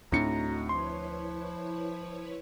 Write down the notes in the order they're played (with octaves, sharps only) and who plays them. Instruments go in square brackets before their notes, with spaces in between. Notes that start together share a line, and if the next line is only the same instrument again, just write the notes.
[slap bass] D2 C4 D4 [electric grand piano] A2 C#7 [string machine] D#4 F#4 [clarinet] A#5
[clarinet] F3 [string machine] E4 B4 C#5 [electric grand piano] C6